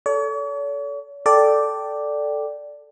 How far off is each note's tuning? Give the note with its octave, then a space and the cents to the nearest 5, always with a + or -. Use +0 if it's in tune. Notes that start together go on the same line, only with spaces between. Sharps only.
A4 +0 C#5 +45
A4 +0 D5 +0 G5 -10